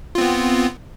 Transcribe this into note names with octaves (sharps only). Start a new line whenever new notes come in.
B3 C4 F4